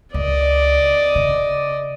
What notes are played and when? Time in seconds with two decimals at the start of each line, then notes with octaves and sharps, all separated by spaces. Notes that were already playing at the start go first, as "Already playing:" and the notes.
0.14 C#2 D5 D#5
1.15 C#3